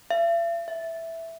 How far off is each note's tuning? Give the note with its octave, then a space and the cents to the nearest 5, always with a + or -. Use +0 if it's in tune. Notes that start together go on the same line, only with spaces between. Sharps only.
E5 +45
E5 +0